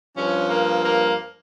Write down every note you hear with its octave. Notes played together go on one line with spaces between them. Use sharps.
G2 F3 C#4
A#3
A#3